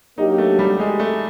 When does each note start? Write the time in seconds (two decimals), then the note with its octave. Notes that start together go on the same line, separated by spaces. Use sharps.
0.18 F#3 A#3 D4 D#4 G4
0.38 A3
0.59 G3
0.80 G#3
1.00 A3